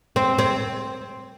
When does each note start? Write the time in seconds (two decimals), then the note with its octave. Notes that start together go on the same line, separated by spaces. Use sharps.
0.16 C4
0.39 C4